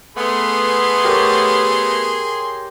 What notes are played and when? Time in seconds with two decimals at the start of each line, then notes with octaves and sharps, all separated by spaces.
0.17 A3 B3 G#4 C6
1.04 G4 A#4 C#5